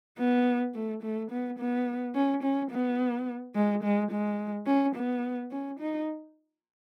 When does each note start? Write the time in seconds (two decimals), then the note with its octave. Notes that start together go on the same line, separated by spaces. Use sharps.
0.18 B3
0.74 A3
1.03 A3
1.31 B3
1.59 B3
2.15 C#4
2.43 C#4
2.71 B3
3.55 G#3
3.83 G#3
4.11 G#3
4.67 C#4
4.95 B3
5.51 C#4
5.80 D#4